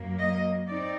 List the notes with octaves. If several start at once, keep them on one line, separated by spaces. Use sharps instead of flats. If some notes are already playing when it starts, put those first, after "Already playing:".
Already playing: F#2 F#3 A#3
D#5
C4 D#4 D5